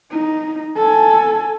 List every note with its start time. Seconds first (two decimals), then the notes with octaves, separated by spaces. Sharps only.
0.11 D#4
0.77 A4 G#5